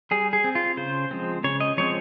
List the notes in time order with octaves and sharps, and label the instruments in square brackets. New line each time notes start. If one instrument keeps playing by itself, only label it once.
[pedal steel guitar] G3 G#4
G#4
C4
F4
C#3 C5
F3 G#3 C4
C#3 C#5
D#5
F3 G#3 C4 C#5